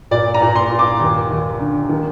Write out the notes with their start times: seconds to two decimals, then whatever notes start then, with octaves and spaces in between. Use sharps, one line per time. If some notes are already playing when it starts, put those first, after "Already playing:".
0.11 A#2 D5
0.34 A#5
0.42 A#2
0.56 C6
0.71 A#2
0.79 D6
1.00 D#2
1.31 D#2
1.60 D3
1.89 D#3